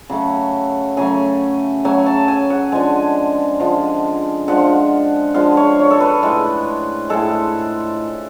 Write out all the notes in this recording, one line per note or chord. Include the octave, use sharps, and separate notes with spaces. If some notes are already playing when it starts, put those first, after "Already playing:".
Already playing: G#5
C#3 F#3 A3
C#3 F#3 A3 G#5
C#3 F#3 A3 G#5
A5
G#5
F#5
D3 F3 G#3 G#5
D3 F3 G#3
D3 F3 G#3 F#5
D3 F3 G#3 F5
C#5
C#5
A4
B4
A2 G#3
A2 G#3 A4